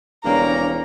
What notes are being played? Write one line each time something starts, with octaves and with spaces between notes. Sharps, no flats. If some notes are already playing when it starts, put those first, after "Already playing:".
E1 D#2 C#3 G3 A#3 D4 C#5 A#5